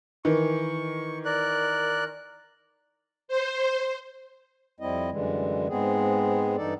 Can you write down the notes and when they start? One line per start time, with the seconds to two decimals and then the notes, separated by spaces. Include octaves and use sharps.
0.25 D#3 E3 C#6
1.25 A#4 D5 F#6
3.28 C5
4.80 F2 G3 C4 E4 D#5
5.11 F#2 D3 E3 G3 G#3
5.68 G#2 G#3 B3 C4 G#4
6.57 G2 E3 D#4 A4 D5